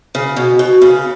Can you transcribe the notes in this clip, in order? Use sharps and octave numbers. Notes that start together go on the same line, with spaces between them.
C#3
B2
B2
C#3